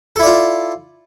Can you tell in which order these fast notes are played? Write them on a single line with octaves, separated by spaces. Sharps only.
A4 E4 D5 F4